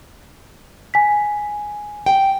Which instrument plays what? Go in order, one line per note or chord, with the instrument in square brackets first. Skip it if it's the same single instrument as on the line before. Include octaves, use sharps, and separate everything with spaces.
[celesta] G#5 B6
[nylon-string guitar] G5